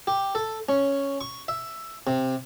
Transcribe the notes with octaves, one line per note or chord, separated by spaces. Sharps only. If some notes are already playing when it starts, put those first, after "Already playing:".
G4
A4
C#4
C#6
E5
C3